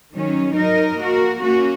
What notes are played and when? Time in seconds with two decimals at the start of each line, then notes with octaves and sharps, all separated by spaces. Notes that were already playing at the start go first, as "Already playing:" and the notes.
0.13 D#3 F#3 C#4
0.55 F#3 D#4 A#4 D#5
0.98 A#3 F#4 A#4
1.42 A#3 C#4 F#4